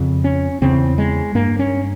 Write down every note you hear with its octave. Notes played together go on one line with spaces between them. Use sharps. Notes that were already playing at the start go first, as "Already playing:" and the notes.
Already playing: F2 C#3
C#4
E2 C#3 C4
G#3
G2 A#3
C#4